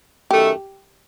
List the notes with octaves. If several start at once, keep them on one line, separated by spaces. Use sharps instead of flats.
F#2 D#3 A3 G4